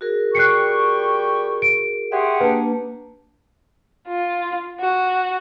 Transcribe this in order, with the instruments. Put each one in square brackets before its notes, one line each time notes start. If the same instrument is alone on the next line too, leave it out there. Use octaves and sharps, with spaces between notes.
[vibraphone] F#4 G#4 A#4
[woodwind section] G3 G5 C#6 [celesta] F#6 C7 C#7
[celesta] D7
[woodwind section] G4 G#4 F#5 [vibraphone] E5 C6 C#6
[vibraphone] A#3 D4 A5 [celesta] B4
[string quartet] F4
F#4